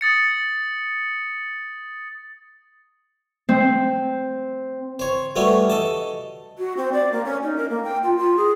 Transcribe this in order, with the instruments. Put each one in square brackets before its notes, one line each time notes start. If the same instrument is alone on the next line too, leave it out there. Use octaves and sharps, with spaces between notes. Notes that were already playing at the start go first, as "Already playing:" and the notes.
[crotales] D#6 A6 C#7
[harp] C4
[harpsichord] C5 C#5
G3 A3 B3 C#4 F#4
A4 D#5 A5
[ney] F#4
C4
D5
A#3
C#4
D#4
A#4
A#3
G5
F4
F4
G#4